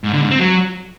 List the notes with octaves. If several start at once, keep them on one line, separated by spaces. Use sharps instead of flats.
G#2
D3
G#2
C4
F#3